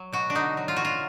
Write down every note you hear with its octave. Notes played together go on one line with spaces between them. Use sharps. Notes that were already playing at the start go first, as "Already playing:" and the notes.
Already playing: F#3
B2 F#4
D4
D3 D#4
F#3
F4
F#3 F#4
F4